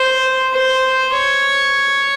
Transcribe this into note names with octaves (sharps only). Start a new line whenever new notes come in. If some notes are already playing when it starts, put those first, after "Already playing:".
Already playing: C5
C5
C#5